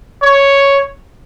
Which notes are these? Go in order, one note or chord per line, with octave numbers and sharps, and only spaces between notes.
C#5